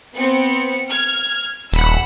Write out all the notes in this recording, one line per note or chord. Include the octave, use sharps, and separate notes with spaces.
B3 C4 C#7
F6 G#6
D#1 F#5 B5 E6